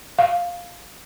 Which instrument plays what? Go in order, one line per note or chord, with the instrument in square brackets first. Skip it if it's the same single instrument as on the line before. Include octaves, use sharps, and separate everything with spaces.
[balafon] F5